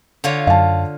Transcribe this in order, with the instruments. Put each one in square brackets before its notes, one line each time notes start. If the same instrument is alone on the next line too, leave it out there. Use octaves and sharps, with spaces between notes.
[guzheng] D3 F4 C#5
[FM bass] F#2 [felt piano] F5 A5